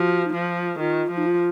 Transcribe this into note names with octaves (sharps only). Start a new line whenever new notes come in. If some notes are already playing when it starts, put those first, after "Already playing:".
Already playing: F3 F#4
D#4
F3 F4
D#3 F4
F3
D#4
F4